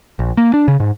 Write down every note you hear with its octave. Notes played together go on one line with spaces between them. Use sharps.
A#1
A#3
D4
C#3
G#2